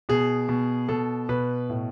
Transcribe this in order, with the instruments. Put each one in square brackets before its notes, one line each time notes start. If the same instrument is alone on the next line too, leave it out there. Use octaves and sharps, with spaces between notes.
[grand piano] B2 G#4
B2
B2 A4
B2 B4
A2